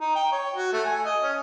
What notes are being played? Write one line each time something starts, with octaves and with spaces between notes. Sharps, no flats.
D#4
G5
C#5
F#4
A3
G#5
D#5
C#4